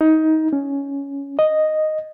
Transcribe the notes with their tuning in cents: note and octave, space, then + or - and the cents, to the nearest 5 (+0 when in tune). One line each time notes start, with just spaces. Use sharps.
D#4 +20
C#4 +10
D#5 -5